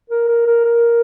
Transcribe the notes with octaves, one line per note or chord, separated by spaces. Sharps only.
A#4
A#4
A#4
A#4